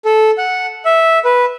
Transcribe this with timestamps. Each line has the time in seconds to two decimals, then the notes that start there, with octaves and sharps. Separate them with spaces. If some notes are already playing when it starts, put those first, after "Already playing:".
0.05 A4
0.38 F#5
0.85 E5
1.25 B4